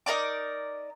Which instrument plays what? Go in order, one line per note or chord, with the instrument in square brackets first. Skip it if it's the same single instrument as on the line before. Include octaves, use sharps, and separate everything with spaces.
[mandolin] D#4 A#4 D5 D6